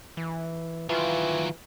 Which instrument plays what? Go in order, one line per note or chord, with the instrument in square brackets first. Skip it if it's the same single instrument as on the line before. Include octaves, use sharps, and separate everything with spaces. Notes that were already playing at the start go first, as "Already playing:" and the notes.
[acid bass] E3
[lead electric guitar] D#3 F#3 [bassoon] E3 [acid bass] F4